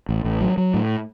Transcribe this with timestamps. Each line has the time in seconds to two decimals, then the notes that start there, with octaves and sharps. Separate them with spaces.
0.09 A1
0.24 A1
0.41 F#3
0.57 F#3
0.74 A2